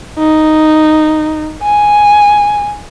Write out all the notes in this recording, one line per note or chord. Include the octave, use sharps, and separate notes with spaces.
D#4
G#5